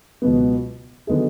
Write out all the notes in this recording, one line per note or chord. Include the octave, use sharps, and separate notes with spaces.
C#2 B2 F#3 B3
D3 F#3 B3 D#4 G#4